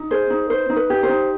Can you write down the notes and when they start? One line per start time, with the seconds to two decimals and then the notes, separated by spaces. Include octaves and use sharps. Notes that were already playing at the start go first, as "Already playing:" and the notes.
Already playing: D#4
0.11 G#4 C5
0.30 D#4
0.50 B4 C5
0.70 D#4
0.76 B4
0.90 G4
1.03 C5
1.09 D#4